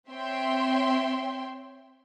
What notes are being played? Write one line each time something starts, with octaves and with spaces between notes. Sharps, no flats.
C4 C#5 E5 G5 C6